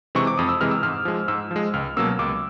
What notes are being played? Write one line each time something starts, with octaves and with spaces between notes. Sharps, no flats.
C3 E3 G#3 C4 C#6
D6
F2 D#6
E6
C3 E3 G#3 C4 F6
E6
G#2 F6
F3 G#3
G#2 E6
F3 G#3
C#2 F6
B2 F#3 A#3 C#4 E6
C#2 D6